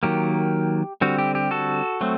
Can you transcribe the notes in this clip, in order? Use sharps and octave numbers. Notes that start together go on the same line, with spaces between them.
D#3 F#3 A#3 G4
D3 G3 C4 F#4
G4
G4
F#4 A4
F#3 A3 C4